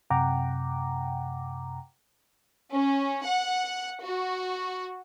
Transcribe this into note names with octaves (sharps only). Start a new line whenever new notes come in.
F#2 C3 F#5 G5 A#5 D6
C#4
F#5
F#4